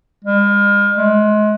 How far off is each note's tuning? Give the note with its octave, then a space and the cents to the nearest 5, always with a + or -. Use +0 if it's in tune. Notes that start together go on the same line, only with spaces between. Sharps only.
G#3 -45
G#3 +30